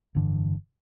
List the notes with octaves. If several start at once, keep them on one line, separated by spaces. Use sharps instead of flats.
F1 G2 D3 E3